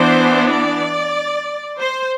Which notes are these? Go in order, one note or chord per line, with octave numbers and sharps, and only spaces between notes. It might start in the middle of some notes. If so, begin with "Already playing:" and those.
Already playing: E3 B3 D4 C5
D5
C5